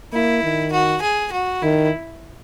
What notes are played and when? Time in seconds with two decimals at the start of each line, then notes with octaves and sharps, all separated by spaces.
0.13 A#3 E4
0.43 D#3
0.72 F#4
1.02 G#4
1.32 F#4
1.62 D#3 E4